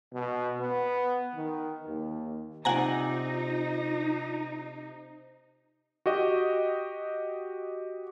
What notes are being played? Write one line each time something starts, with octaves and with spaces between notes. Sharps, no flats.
B2
B3
D#3
D#2
C3 D#4 F4 D5 F#5 G#5 A#5
F#4 G4 D#5